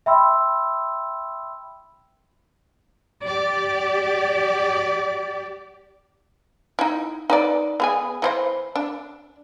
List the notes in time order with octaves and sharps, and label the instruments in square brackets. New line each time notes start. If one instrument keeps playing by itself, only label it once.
[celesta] E5 G5 B5 C6 E6
[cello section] G4 D5
[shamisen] D#4 E4
D#4 B4 D5
B3 G#4 G#5
E3 F4 C5
D4